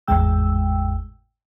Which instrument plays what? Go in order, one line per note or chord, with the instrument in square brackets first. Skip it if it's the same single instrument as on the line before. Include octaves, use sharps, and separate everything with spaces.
[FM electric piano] G#1 E2 A2 G#3 G5 E6